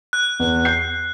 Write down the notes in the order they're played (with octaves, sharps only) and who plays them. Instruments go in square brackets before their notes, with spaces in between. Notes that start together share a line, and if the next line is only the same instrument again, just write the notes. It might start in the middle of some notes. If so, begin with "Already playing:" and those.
[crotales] F#6
[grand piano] E2
G6 C7